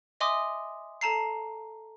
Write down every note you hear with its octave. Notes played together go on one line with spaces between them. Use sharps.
D#5 E5 G#5 C6 D6 D#6
A4 A5 A#5 C7